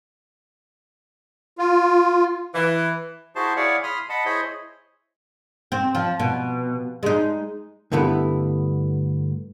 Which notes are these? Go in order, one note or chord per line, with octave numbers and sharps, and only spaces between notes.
F4
E3
E4 F#4 G#4 C5 A5 C6
E4 G#4 C#5 D5 F5 F#5
B5 C6 D#6 F6
D#5 F#5 A5 B5
E4 G#4 C5 C#5 D#5 B5
C4
F3
B2
G#3 D#4
G2 D3 A3 B3 E4